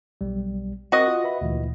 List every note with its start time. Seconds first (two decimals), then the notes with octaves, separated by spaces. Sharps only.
0.21 B1 G3
0.92 C4 F#4 A#4 D#5
1.08 F4
1.24 B4 E5 B5
1.41 D2 A#2 E3